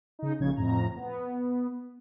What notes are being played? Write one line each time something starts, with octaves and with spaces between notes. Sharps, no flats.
C#3 D#4
A#1 C#3 G#6
F2 A2 A#5
B3